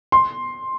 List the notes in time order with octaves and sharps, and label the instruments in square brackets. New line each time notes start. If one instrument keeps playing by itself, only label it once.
[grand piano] C6